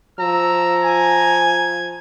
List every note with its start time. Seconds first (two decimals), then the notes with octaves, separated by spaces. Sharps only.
0.19 F3 A#5 E6
0.83 G#5 G#6